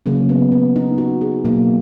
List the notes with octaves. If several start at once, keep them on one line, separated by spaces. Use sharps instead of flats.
C#3 F#3 A#3 C#4
B3
B3
D#4
F#4
G#4
B2 F#3 A#3